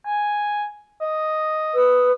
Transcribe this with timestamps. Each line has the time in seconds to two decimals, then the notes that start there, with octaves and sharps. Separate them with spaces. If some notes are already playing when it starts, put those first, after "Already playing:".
0.06 G#5
1.01 D#5
1.74 B4 D#6 E6